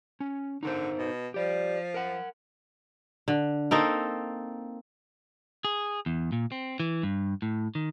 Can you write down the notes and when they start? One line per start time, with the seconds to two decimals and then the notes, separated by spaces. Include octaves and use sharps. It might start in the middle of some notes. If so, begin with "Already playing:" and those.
0.20 C#4
0.63 D3 D#4 A#4 C5
0.97 B2
1.34 F3 G4 D5
1.94 A#4 F#5
3.28 D3
3.71 A#3 C4 D#4 A4
5.65 G#4
6.06 E2
6.32 A#2
6.52 C4
6.80 E3
7.03 G2
7.42 A2
7.75 D#3